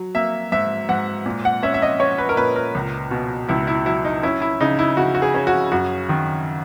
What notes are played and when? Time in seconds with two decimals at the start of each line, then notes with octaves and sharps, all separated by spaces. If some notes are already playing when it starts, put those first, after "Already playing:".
Already playing: F#3
0.15 A#3 E5
0.52 G#2 E5
0.89 G#2 F#5
1.26 A#2
1.45 F#5
1.63 C#4 E5
1.74 E5
1.82 D#5
2.00 C#4 C#5
2.18 B4
2.29 A#4
2.37 A#2 B4
2.56 A#4
2.75 C#2
3.11 B2
3.48 C#2 E4
3.67 E4
3.86 F#3 E4
4.05 D#4
4.23 C#4 E4
4.41 E4
4.61 C#3 D#4
4.79 E4
4.97 C#3 F#4
5.15 F#4
5.22 G#4
5.34 C#4
5.47 F#4
5.72 F#2 F#4
6.09 D#3